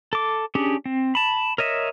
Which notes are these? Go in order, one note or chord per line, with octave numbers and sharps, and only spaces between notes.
A4 D6
C#4 D4 G4 G#4
C4
A5 B5
A#4 C#5 D#5 E5